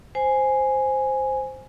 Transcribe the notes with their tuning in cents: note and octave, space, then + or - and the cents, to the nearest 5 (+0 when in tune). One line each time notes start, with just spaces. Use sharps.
C5 +0 G#5 +0